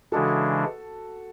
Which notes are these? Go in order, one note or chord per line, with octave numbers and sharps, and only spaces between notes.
C#3 E3 G#3 D4 F#4 A4